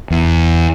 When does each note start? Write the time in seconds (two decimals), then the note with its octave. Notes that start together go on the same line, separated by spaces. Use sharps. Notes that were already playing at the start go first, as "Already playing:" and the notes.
0.10 E2